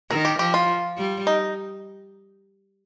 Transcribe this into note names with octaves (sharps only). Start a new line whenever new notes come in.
D#3 A#4
G4
F3 G4
F4
G3
D#4